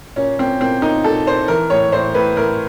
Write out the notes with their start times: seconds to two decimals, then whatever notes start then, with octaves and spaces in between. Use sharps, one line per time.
0.16 A#2 C#4
0.39 A#2 C4
0.61 A#2 C4
0.82 A#2 D#4
1.04 A#2 A4
1.27 A#2 C5
1.48 E3 A#4
1.70 A2 C#5
1.92 A2 C5
2.14 A2 B4
2.37 A2 A#4